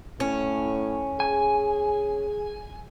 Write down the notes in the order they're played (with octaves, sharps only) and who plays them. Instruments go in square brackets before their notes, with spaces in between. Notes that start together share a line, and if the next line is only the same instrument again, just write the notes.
[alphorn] A2 [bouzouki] C#4
[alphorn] G#4 [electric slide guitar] G#5